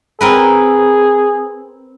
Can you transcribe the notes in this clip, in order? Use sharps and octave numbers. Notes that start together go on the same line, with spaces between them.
C4 G#4 A#4 B4